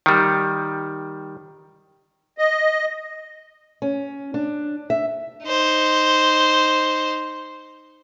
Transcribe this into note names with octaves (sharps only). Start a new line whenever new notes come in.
D#3 G3
D#5
C#4
D4
E5
D#4 C5